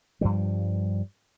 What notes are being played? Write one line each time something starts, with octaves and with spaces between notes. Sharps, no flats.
G2 F3 G3